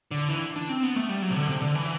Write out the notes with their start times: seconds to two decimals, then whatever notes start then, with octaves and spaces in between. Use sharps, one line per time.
0.11 D3
0.29 E3
0.56 D4
0.69 C4
0.83 B3
0.96 A3
1.09 G3
1.22 F#3
1.30 C3
1.36 D3
1.48 C3
1.62 D3
1.75 E3